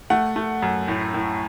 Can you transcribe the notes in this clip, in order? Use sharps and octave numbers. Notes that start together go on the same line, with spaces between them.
A3 F#5
A3
F#2
A2
A2